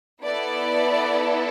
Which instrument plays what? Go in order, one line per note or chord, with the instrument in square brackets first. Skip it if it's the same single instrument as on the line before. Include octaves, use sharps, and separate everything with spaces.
[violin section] B3 E4 A4 D5